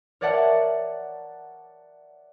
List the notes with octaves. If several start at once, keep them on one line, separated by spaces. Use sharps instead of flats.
A#4 C#5 D5 E5 F#5 A5